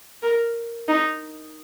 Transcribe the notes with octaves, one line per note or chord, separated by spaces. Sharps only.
A#4
D#4